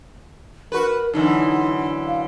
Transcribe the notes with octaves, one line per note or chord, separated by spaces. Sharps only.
F#4 A#4 B4
F#2 D3 E3 D#4
F5